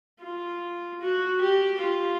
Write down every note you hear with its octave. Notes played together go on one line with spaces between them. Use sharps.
F4
F#4
G4
F4